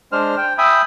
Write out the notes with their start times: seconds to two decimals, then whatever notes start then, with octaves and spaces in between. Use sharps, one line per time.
0.12 G#3 D4 C5 F6
0.37 G5
0.58 E5 G5 G#5 B5 D#6